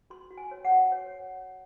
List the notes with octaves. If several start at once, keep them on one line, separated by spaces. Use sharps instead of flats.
F#4 C6
F#4
G#5
C#5
F#5
F#4
C#5